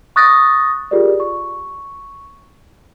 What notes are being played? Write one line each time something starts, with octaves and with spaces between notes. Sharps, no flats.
C#6 D#6 F#6 A6 A#6
F4 G4 G#4 A#4 D5
C#6